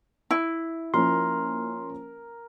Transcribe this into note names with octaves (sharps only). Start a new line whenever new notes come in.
E4
F3 A#3 C#4 A#4 C6